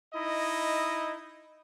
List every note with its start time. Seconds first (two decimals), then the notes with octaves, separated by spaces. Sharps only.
0.14 D#4 E4 D#5